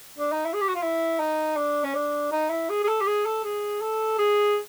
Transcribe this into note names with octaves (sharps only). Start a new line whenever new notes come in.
D4
D#4
E4
G#4
G4
F#4
F4
E4
D#4
D4
C#4
D4
D#4
E4
G#4
G#4
A4
G4
G#4
A4
G#4
A4
G#4